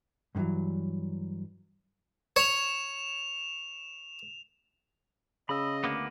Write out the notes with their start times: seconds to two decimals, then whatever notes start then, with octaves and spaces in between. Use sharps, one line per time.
0.35 G2 B2 D3 E3 F#3
2.36 C#5 E7 F7
5.49 C#3 D#5 B5 E6
5.84 D2 A#3 B3 D6